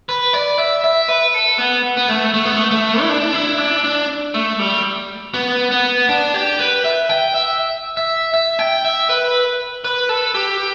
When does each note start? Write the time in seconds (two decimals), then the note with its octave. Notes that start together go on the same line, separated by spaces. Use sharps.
0.09 B4
0.33 D5
0.58 E5
0.84 E5
1.08 B4
1.34 A4
1.58 B3
1.97 B3
2.08 A3
2.34 A3
2.45 B3
2.57 A3
2.71 A3
3.01 E4
3.09 D4
3.34 E4
3.58 D4
3.84 D4
4.34 A3
4.59 G3
5.34 B3
5.71 B3
6.09 D4
6.34 G4
6.59 B4
6.84 E5
7.09 G5
7.34 E5
7.97 E5
8.34 E5
8.59 G5
8.84 E5
9.09 B4
9.84 B4
10.09 A4
10.35 G4